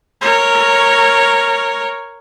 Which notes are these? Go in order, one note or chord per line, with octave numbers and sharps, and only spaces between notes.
A#4 C#5